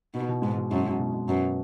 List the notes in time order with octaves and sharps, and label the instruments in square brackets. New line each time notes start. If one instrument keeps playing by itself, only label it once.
[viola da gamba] B2 [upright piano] D#4
[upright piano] B2
[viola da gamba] G#2 [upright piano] G#3
[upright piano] B2
[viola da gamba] F#2 [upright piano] G#3
[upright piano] B2
B2
B2
[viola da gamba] F#2 [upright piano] B3